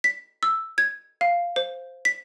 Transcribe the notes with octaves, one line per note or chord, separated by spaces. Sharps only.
B6
E6
G#6
F5
C5
B6